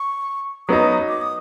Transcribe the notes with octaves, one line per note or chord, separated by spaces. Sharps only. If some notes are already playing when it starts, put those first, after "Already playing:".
Already playing: C#6
F#3 B3 D#4 D#6
D6
D#6